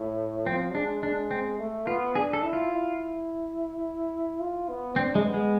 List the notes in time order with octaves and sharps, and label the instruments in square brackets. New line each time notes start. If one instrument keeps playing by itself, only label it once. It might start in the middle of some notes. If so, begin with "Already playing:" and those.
Already playing: [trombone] A2
[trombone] F3 [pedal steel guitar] C4
[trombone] G#3 [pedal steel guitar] D4
[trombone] G#3 [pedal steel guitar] D4
[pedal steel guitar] C4
[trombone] A3
[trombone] B3 [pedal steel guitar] F4
[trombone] D4 [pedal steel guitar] G#4
[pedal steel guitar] A4
[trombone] E4
[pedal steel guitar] F4
[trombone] E4
F4
B3
[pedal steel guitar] C4 [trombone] D4
[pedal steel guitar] G#3
[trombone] B3
[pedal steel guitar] G#3